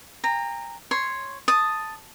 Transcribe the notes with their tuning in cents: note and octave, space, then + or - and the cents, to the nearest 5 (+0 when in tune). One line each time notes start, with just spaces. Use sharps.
G5 +40 A#5 -10
C#5 -5 C6 +0
A5 +0 D#6 +0